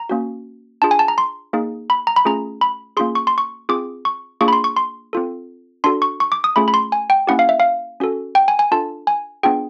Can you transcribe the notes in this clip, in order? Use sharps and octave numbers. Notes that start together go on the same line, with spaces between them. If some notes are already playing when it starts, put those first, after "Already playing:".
Already playing: A#5
A#3 C#4 F#4
D4 F4 G#4 A5
G#5
A5
A#5
C6
A#3 D#4 G#4
B5
A#5
B5
A3 C#4 F4 G#4 A#5
B5
A#3 C#4 F4 G#4 C6
C#6
C6
C#6
C4 F4 G#4 D6
C#6
A#3 D4 F4 G#4 C#6
B5
C6
C#6
C6
C4 F4 A4
D4 F#4 A4 C6
C#6
C#6
D6
D#6
A3 C#4 F4 G#4 B5
B5
C6
G#5
G5
A#3 C#4 E4 G4 F#5
F5
E5
F5
C#4 F#4 A4
G5
G#5
G#5
D4 F4 A4 A5
G#5
B3 D4 F4 G#4 G5